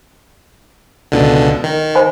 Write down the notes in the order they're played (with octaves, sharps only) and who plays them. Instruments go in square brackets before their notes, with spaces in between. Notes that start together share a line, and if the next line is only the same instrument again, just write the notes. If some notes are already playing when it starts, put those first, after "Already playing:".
[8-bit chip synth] C#2 B2 D3
D#3
[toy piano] C5 G#5 B5